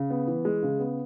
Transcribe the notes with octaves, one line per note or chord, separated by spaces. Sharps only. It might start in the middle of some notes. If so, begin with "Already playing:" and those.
Already playing: C#3
B3
E3
G#3
C#3
B3